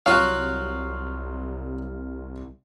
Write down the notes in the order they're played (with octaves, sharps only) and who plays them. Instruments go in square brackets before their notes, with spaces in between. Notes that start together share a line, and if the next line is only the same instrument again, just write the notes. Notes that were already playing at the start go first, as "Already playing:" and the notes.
[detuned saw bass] C2 [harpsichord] F#3 F#4 [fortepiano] F4 F5